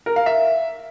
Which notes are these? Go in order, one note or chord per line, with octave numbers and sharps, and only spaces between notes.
A#4
F5
E5